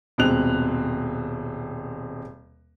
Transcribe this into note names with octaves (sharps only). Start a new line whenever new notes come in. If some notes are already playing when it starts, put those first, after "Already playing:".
D#1 B2 G#3 C4 F#6 F7